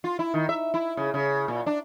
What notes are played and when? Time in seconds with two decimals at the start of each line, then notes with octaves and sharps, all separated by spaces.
0.04 F4
0.19 E4
0.34 D#3
0.49 E5
0.74 E4
0.97 C#3
1.14 C#3
1.48 A#2
1.66 D4